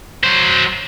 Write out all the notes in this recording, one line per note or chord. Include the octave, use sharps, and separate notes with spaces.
F#3 C5